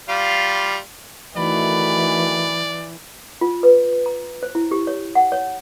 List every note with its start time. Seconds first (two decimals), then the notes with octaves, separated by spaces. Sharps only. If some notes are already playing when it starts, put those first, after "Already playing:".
0.09 G3 F4 F5
1.36 D#3 E3 A3 F#4 D5 B5
3.41 F4
3.63 B4
4.06 A#5
4.43 C5
4.55 E4
4.71 G4
4.87 C#5
5.15 F#5
5.32 C#5